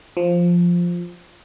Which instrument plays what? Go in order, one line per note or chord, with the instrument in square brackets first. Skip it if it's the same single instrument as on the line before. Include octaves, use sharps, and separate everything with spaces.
[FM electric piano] F3